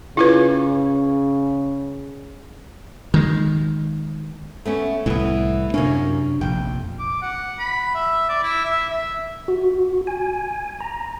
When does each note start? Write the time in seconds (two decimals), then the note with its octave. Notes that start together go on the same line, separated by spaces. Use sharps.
0.17 C#3 E4 F4 B4
3.14 D#3 G#3
4.65 A3 B3 C#4
5.06 C2 A2 E3 B3
5.74 F#2 C3 A#3 C#4 D4
6.41 F1 A#1 G5
6.99 D6
7.22 F#5
7.59 B5
7.95 E5
8.29 D5
8.43 E4
8.65 E5
8.89 E5
9.48 F#4
10.07 G#5
10.80 A#5